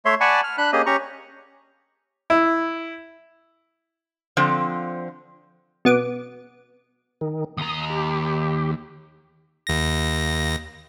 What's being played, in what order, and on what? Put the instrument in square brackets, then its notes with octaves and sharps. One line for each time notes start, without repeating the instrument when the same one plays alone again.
[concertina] A3 C#5 E5 C6
D5 F#5 G#5 A5 B5 C#6
F6
D4 B5 F#6
A#3 C#4 G4 G#4 D#5
C#4 G4 A#5 C#6
[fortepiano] E4
[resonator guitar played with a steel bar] D3 F3 C4
[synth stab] B2 B3 D6
[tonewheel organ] D#3
[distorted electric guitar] D#2 A#5 [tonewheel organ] D#6
[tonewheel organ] G4
[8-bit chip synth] D#2 A#6